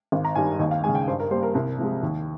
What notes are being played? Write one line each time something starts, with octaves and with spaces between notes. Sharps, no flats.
G#1 F5
A#5
G2 D#3 G3 G#5
D#2 D#5
F5
C#3 G#3 G#5
G5
G2 C5
A#4
G3 A#3 C5
A#4
C2 A#4
C3 F3 G#3
D#2